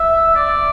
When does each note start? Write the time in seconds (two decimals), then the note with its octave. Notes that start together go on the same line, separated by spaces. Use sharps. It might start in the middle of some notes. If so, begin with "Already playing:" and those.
Already playing: E5
0.35 D5